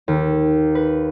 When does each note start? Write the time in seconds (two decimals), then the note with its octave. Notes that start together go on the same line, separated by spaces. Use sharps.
0.08 D#2
0.75 B4